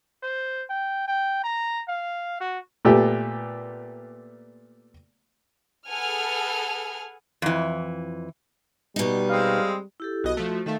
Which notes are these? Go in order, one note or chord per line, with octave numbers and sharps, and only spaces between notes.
C5
G5
G5
A#5
F5
F#4
A#2 A3 B3 G4
G#4 A4 B4 F#5 G#5 F6
F2 E3
B2 G3 D#4
G#3 C4 F5
E4 G4 A4
B1 F#4 D#5
F3 A3
D#3 A3 A4 E5 F5